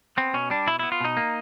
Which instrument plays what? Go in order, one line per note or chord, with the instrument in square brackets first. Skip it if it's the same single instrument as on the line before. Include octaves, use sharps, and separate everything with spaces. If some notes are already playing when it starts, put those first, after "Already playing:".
[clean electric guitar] B3 C4
B2 C#4
G3 D4
B2 E4
B3 E4
F4
B2 D#4
A#3